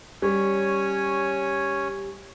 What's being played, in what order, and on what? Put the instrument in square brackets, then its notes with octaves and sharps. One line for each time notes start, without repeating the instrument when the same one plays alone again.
[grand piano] G3 [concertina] C#4 C#5 G#5